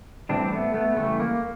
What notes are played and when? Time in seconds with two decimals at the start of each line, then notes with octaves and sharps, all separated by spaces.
0.29 A2 E3 G3 C4 D4
0.52 A3 B3
0.74 A3 B3
0.97 C#3 E3 G3 A3
1.20 A#3